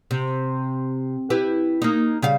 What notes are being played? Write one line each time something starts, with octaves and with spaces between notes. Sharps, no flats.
C3
E4 G4 B4
A#3 D#4
C#3 G3 F5